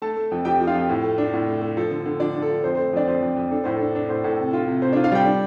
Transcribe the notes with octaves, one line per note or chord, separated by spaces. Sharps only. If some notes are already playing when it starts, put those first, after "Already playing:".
A3 A4 A5
A3
F2
F2 G4 G5
F3
F4 F5
F2
A2
A3
D4
A2
A3
A3
F3 A4
D3
D3
F3 D4 D5
D4
A4
F3
F2 C5
A3 C5
F2 D4 D5
F2 C5
F2
F2
D4 A4
A2 C5
D4 A4
D4
A2 C5
A2 A4
C3
F4
C3
C3 C5
D4 F4 D5
F4 F5
G3 G4 G5
D4